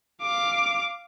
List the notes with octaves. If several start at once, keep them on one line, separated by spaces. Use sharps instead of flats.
F5 D6